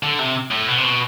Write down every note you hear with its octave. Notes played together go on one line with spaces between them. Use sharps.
D3
C3
A2
B2
C3
B2